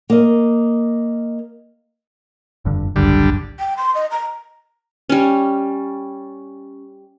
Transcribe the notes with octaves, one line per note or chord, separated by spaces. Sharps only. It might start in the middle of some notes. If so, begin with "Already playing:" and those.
A#3 D#5
F1 G2 D3
G#1 C#2 F#2 D3 G3
G5
C6
D#5
A#5
G3 C#4